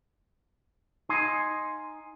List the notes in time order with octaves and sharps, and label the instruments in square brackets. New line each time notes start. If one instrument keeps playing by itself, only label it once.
[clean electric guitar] D#4 F5 G#5 C6